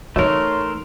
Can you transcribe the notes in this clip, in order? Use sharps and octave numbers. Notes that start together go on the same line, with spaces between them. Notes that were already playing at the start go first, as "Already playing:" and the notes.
E3 A3 D#4 A#4 C#5 C6